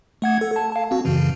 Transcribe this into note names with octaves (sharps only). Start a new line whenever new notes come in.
A3 F#5 G#6
A4
A5
F5 A5
C4 F#4
F#2 C#3 E3